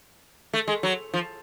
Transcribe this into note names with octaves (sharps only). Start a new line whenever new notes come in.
A3
G#3
F#3
F3